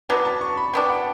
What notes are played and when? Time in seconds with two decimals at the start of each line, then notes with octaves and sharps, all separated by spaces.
0.09 F#3 B3 D4 A5
0.25 A5
0.41 C#6
0.57 B5
0.73 F#3 B3 D4 G5
0.89 F#5